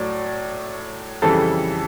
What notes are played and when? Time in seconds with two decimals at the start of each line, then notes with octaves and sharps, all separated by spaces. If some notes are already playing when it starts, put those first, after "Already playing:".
Already playing: A2 F#3 D5
1.22 F2 C#3 E3 G3 A4 A5